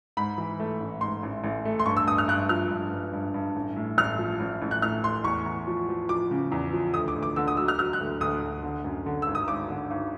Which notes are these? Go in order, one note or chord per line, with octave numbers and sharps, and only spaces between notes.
G#2 B5
E3
A3
A1
G#2 C6
A1
A1
A3
C6
G2 C#6
E6
G2 D#6
F6
G2 F#6
F3 F6
G2
G2
G2
G2
A1
A2
A1 F6
F3
A1
A1
F#6
A2 F6
A2 C6
E2 C#6
E2
F3
F3
F3 D6
C#3
E2
F3
D2 D#6
D6
D2
D6
D3 E6
D#6
F#3 E6
F6
F#3 F6
F#6
D2
D2 D#6
D2
D3
F#2
D3
G#1 E6
D#6
G#1 D6
D3
G#1